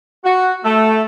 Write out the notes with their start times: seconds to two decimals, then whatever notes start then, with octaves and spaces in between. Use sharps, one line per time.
0.24 F#4
0.64 A3